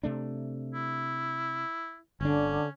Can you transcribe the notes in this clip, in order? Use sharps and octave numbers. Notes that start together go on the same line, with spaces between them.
C3 A3 D4
E4
G1 D3 C#4 D4